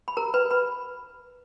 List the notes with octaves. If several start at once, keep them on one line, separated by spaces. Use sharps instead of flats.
B5
A#4 A#5
B4 B5
B4 B5